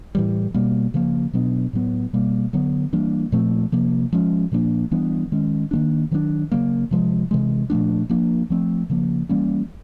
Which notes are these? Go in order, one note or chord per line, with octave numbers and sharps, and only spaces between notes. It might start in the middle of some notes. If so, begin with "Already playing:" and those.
A2 E3 G3
B2 G3 A#3
C#3 F3 A#3
B2 F#3 B3 D4
A2 F#3 B3
B2 G3 A#3
D3 F#3 B3
E3 G3 A#3 D4
A#2 F3 A3 C4
C3 F3 A#3
F3 G#3 C#4
A#2 F3 A#3 D4
E3 G3 B3 D4
D#3 G#3 C#4
D#3 F#3 A#3 D4
D#3 F#3 B3 D4
C#3 F#3 A#3
C3 F3 G#3
C3 E3 G#3
A#2 F3 A3 D4
F3 A#3 D4
F3 A3 C4
C#3 F3 A#3
E3 G3 A#3 C#4